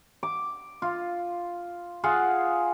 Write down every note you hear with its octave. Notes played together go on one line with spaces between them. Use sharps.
D6
F4
F4 G#4 F5 F#5